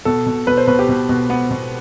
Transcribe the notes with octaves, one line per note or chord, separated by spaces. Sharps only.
B2 A4
B2
B2 B4
C5
B2 B4
G4
B2
B2
B3
B2